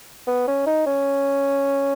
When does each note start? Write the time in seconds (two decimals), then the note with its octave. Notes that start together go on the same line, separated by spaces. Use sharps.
0.27 B3
0.48 C#4
0.66 D#4
0.86 C#4